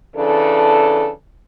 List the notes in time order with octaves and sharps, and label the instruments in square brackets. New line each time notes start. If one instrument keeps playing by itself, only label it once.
[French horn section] C#3 E3 D4 A4